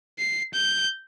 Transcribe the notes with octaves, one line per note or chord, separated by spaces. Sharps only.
C7
G6